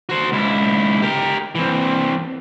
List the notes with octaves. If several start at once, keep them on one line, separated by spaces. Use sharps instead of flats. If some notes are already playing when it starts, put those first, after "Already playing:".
F#4 C5
C#2 E4
G4 A#4
E3 C4